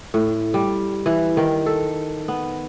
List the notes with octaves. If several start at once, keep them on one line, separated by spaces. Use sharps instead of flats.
A2
G3
E3
D#3
A4
B3